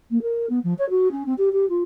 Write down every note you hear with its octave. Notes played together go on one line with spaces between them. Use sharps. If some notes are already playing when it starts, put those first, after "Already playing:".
A#3
A#4
B3
F3
C#5
F#4
C#4
C4
G4
G4
F4